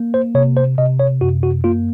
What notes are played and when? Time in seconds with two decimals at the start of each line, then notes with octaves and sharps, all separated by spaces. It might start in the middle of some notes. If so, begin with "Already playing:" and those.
Already playing: A#3
0.14 C5
0.35 C3 C#5
0.57 C5
0.78 C3 D#5
1.00 C#5
1.21 F#2 F#4
1.43 F#4
1.64 A#3 F4